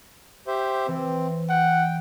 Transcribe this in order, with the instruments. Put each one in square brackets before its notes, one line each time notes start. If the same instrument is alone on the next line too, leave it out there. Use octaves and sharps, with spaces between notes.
[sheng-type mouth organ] G4 C5 E5
[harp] E3 [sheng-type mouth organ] C4
[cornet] F#5 [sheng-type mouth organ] G5